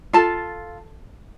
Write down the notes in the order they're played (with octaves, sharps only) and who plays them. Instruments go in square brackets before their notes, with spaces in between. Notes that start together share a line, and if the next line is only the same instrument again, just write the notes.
[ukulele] F4 A4 A5